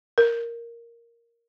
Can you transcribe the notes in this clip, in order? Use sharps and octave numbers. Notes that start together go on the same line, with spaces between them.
A#4